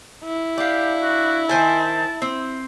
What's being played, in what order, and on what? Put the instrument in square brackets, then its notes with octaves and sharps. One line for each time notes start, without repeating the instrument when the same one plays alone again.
[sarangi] E4
[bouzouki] D4 F5 [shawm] G4
[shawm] F#4
[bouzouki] D#3 C5 G#5 [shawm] A5
[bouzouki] C4